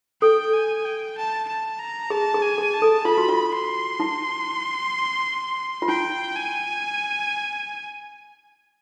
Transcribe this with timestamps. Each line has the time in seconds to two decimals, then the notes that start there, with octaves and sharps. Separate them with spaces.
0.22 A4 G5
0.54 G#5
0.85 G5
1.17 A5
1.48 A5
1.79 A#5
2.10 G#4 A5
2.34 G#4
2.42 G#5
2.58 G#4
2.74 A5
2.82 A4
3.05 F4 B5
3.18 F#4
3.29 F4
3.52 C6
4.00 E4
5.82 F4
5.88 E4 G5
6.36 G#5